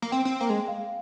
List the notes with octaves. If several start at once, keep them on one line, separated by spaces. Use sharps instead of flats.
A#3
C4 G5
C4
A#3
G#3
F5